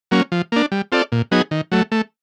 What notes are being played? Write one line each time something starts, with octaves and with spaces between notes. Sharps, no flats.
F#3 A#3 C#4
F3
A#3 D4
G3
C4 F4 A4 D5
A#2
F#3 B3 D#4 G#4
D#3
F#3 A3
A3